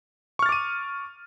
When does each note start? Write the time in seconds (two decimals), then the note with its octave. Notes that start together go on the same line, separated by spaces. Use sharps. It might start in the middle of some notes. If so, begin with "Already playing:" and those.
0.39 C#6
0.43 F6
0.46 A6
0.49 D6
0.52 D#7